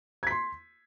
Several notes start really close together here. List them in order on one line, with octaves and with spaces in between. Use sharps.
G#6 B6 C6